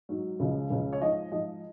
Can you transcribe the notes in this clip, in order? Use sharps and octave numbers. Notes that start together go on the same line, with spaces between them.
G#2 F#3
C#2 C#3 F3
C#2 C#3 F3
C#5
G#2 F3 D#5
G#2 F3 D#5